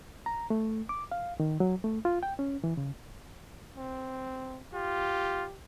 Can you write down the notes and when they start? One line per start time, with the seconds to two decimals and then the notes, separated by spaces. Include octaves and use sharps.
0.26 A#5
0.50 A3
0.89 D6
1.12 F5
1.40 D#3
1.60 F#3
1.84 A3
2.05 F4
2.23 G5
2.39 C#4
2.64 E3
2.77 C#3
3.77 C4
4.74 F4 G4